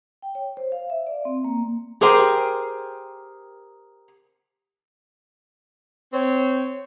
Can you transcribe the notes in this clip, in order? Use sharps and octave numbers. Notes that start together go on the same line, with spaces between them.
G5
C#5
C5
F5
E5
D5
C4
A#3
G4 G#4 A#4 C5 G5
C4 C#5